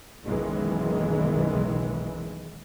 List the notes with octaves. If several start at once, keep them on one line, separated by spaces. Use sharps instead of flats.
F#1 B1 D#3 E3 G#3